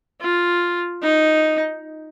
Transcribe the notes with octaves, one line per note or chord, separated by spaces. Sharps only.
F4
D#4